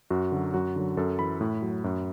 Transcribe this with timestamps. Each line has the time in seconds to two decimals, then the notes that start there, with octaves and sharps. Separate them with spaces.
0.10 F#2 F#4
0.32 D3 F#3
0.54 F#2 F#4
0.76 D3 F#3
0.97 F#2 A4
1.19 E3 B5
1.41 A2
1.62 F#3
1.84 F#2